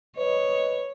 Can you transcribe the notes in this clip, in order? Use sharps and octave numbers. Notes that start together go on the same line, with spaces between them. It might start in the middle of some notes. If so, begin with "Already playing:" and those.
B4 C#5 D#5